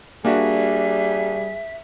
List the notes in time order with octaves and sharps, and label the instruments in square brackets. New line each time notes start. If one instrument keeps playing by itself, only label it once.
[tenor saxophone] G3 [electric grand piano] A#3 D4 F#4 [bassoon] G#4 [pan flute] E5